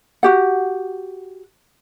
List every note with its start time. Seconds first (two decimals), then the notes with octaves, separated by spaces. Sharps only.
0.23 F#4 G4 F#5